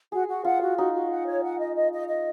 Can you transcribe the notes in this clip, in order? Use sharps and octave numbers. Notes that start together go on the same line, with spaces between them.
F#4 G#4
F#4
F4 F#5
F#4
D#4 F#4
F#4
F#5
C#5
F#5
D#5
D#5
D#5
D#5